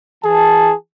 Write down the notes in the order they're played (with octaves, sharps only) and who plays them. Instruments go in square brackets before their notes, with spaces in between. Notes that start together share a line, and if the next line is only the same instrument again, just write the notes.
[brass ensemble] E3 A5 [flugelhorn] G#4